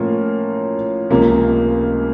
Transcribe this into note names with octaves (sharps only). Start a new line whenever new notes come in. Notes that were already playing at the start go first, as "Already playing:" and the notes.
Already playing: A2 F3 A#3 C#4 F4
C#2 C3 F3 A#3